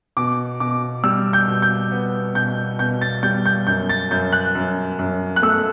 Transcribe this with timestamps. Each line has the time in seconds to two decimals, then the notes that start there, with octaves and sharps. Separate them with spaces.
0.17 B2 D6
0.60 B2 D6
1.04 G3 E6
1.33 G6
1.48 B2
1.62 G6
1.92 B3
2.35 B2 G6
2.79 B2 G6
3.01 A6
3.23 G3 G6
3.46 G6
3.67 F#2 G6
3.89 A6
4.11 F#2 G6
4.32 F#6
4.55 F#2
4.99 F#2
5.36 F#6
5.42 A3 E6